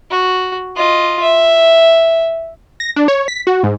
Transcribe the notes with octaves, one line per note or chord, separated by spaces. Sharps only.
F#4
F4 D#5
E5
A#6
D4
C#5
B6
F#4
G#2